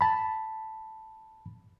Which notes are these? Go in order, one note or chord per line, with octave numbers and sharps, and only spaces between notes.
A5 B5